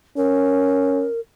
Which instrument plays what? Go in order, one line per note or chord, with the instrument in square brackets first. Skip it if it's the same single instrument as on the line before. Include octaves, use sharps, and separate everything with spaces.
[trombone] C#4 [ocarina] A#4